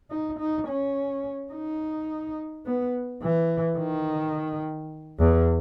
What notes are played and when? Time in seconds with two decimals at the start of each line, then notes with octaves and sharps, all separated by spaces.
0.11 D#4
0.39 D#4
0.68 C#4
1.53 D#4
2.66 B3
3.22 E3
3.78 D#3
5.19 E2